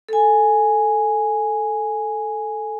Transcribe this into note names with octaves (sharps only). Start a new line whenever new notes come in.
A4 G#5